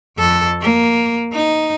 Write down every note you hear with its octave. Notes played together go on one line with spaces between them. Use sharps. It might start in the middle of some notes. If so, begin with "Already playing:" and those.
F2 A4
A#3
D#4